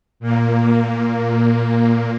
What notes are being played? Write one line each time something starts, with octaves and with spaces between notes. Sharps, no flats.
A#2 A#3